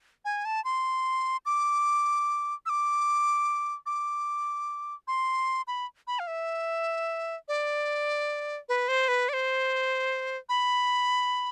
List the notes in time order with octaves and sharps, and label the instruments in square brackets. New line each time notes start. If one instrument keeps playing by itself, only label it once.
[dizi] G#5
A5
C6
D6
E6
D6
D6
C6
B5
B5
F5
E5
D5
B4
C5
B4
D5
C5
B5